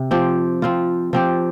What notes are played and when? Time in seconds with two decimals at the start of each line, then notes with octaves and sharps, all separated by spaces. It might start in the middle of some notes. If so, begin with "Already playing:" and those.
Already playing: C3
0.11 F3 C4 G4
0.62 F3 C4 F4
1.13 F3 C4 G4